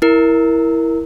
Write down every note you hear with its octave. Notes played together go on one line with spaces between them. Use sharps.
E4 A#4